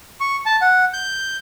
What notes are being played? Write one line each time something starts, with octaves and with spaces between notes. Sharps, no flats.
C#6
A5
F#5
G6